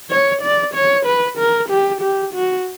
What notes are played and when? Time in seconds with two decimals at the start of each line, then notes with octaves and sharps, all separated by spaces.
0.11 C#5
0.42 D5
0.74 C#5
1.06 B4
1.38 A#4
1.70 G4
2.01 G4
2.34 F#4